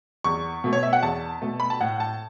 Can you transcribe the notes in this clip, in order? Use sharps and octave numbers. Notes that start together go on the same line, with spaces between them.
E2 C#6
B2 A3
C#5
E5
F#5
E2 A5
B2 A3
B5
A5
A2 F#5
A5